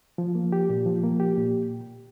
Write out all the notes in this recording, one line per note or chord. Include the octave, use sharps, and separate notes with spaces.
F3
A#3
G4
A#2
F3
A#3
G4
A#2